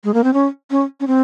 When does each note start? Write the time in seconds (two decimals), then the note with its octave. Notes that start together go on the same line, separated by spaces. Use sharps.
0.04 G#3
0.14 A#3
0.24 C4
0.34 C#4
0.71 C#4
1.00 C#4
1.07 C4